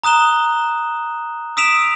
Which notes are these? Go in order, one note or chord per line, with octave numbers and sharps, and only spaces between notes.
A#5 D#6 F#6 E7 G7
D#6 E6 B6 D7 E7 F7